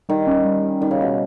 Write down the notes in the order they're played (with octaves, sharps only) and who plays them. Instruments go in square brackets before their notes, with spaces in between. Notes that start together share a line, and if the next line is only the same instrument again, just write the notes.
[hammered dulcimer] D#3 [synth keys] G3
[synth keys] C#4
G3
G3
[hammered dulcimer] D#3 [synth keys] G3
[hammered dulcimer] C#3
[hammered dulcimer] B2 [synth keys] G3